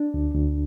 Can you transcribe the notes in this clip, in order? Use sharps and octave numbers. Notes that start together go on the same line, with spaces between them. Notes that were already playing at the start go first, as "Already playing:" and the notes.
Already playing: D4
D2
D2